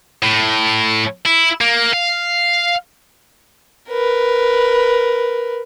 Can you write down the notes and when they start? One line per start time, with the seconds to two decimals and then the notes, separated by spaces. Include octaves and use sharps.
0.22 A2
1.25 E4
1.61 A#3
1.93 F5
3.90 A#4 B4